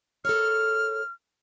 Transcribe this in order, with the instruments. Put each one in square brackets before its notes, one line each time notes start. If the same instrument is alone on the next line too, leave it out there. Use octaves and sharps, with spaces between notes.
[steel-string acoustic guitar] A4 A#4 C#5 [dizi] F6